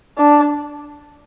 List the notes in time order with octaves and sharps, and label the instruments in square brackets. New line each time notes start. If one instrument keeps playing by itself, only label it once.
[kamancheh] D4